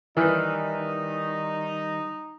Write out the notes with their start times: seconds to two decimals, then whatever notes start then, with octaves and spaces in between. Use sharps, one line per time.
0.17 D#3 E3 G3 D#4